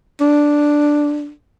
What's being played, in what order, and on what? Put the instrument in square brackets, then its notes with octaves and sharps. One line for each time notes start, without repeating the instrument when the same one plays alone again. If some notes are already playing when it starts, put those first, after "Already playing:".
[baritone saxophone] D4